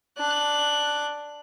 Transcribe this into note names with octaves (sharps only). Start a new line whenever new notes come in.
D4 F#6